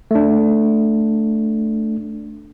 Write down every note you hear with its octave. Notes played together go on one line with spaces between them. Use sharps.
A3 D4